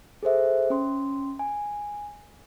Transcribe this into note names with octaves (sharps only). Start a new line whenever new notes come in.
G#4 A4 C5 E5
C#4 C6
G#5